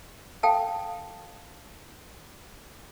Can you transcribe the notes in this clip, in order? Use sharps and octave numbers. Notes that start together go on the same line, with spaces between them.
A4 F5 G5 A5